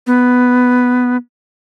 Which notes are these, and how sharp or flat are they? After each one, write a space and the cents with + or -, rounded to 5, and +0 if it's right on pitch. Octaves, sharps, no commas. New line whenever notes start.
B3 +5